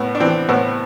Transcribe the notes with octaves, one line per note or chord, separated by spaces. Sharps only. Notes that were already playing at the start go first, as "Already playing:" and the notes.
Already playing: A2 B3
D4
E3 C4
A2 B3